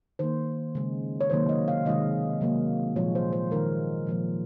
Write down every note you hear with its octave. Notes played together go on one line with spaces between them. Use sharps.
D#3 A#3 C5
C#3 G#3
C#5
C3 D#3 F#3 A#3 C5
D#5
F5
C3 D#3 G#3 D#5
C3 F#3 A#3
A#2 F3 G#3 C#5
C5
C5
D#3 G#3 A#4
A#2 F3 G#3